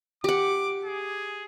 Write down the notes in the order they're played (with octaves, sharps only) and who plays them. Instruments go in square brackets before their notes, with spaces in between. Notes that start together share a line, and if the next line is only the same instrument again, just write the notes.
[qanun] G4 F#5 [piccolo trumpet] D6
[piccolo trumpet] G#4